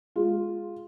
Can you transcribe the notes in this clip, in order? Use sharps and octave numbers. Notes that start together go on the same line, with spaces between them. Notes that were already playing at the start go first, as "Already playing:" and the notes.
G#3 F4